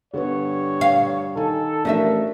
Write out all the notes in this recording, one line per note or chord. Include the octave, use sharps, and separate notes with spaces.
G2 D3 B3 C#5
F5
D#3 A4 G#5
A1 F3 A3 D4 A#4 E5